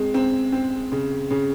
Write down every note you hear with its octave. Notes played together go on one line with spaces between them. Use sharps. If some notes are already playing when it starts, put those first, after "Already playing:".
Already playing: G#3 C4
C4
C4
C#3
C#3